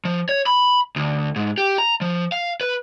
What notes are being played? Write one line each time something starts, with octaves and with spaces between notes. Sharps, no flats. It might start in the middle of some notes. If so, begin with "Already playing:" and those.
F3
C#5
B5
D2
G#2
G4
A#5
F3
F5
B4